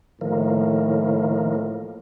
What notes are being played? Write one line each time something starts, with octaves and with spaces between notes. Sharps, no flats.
A2 D#3 F3 A#3